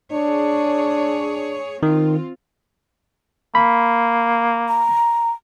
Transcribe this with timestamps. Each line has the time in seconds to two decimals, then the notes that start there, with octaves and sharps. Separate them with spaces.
0.13 D4 G#4 C#5
1.83 D#3 C4 F4
3.55 A#3 B5
4.69 A#5